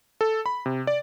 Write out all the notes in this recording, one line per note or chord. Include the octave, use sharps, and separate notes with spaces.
A4
B5
C3
D5